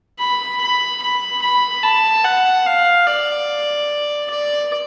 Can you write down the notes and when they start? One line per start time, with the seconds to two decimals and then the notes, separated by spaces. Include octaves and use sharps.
0.19 B5
0.61 B5
1.02 B5
1.42 B5
1.83 A5
2.24 F#5
2.66 F5
3.07 D5
4.30 D5